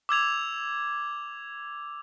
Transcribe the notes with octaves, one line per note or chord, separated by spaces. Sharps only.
D6 E6 G#6 F7